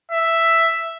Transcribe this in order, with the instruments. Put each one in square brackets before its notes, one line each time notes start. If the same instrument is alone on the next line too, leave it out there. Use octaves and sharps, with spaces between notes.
[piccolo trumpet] E5